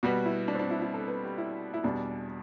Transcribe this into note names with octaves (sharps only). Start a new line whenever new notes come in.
B2 G3 B3 F#4
E4
D4
C4
D4
E4
E4
A4
B4
G4
E4
E4
E2 B2 G3 D4